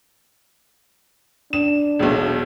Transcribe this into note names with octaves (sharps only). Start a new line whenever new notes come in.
D4 E7
E1 B1